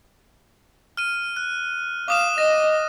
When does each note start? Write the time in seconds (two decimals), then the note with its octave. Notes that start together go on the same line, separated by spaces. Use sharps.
0.97 F6 D#7
1.36 F#6
2.08 F5 D6 D#6 E7
2.38 D#5 A#6